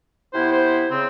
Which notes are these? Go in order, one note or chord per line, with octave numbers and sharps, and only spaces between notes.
C3 B3 E4 C5
C5
C#3 C4